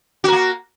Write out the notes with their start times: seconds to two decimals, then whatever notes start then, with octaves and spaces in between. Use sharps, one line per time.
0.24 F#4
0.28 A#4
0.32 A#3